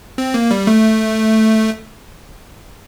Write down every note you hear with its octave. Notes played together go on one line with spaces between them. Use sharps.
C4
A#3
G3
A3